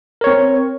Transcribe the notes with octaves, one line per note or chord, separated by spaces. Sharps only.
C4 A#4 C#5